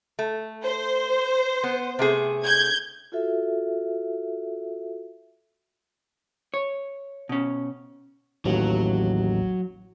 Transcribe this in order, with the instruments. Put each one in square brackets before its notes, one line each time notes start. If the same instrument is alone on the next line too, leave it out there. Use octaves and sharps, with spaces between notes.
[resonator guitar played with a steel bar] A3
[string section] C5
[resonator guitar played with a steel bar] B3
C3 A3 G#4
[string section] G6 G#6
[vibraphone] F4 F#4 A4 E5
[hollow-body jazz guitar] C#5
B2 C#4
[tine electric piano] A1 D#2 A2 [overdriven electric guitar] F#3